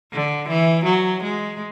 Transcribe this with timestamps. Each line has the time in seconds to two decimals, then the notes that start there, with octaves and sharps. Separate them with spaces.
0.13 D3
0.49 E3
0.85 F#3
1.23 G#3